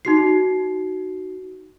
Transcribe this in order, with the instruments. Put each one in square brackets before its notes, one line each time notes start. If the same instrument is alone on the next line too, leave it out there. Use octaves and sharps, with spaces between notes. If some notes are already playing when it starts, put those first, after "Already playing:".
[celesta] D#4 F#4 C7